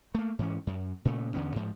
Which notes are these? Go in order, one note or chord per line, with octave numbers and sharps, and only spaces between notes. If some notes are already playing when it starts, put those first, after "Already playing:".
A3 A#3
G#2 E3 C#4
F#2
A#2 C#3 A3
E2 D3 B3 C#4
G#2 F3